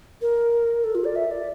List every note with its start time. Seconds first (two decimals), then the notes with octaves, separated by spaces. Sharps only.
0.22 A#4
0.84 A4
0.95 F4
1.04 D5
1.16 E5
1.31 D5